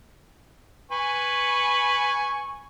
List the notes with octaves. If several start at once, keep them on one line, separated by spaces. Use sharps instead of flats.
B4 G#5 C#6